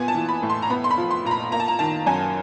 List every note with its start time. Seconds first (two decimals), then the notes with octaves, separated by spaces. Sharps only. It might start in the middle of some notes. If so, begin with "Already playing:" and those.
Already playing: A#2 B3 G#5
0.08 A5
0.15 E3
0.28 B5
0.42 A2
0.50 C6
0.62 A#5
0.70 B3 B5
0.84 C6
0.91 B5
0.97 F3
1.11 C6
1.25 A#2 A#5
1.31 B5
1.52 A#3 A#5
1.60 A5
1.68 A#5
1.79 D#3 A5
2.06 F#2 G#5